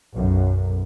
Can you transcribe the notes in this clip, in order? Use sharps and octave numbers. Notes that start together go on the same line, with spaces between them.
B1 F#2